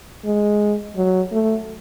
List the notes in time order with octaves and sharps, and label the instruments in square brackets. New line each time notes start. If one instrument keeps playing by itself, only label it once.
[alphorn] G#3
F#3
A3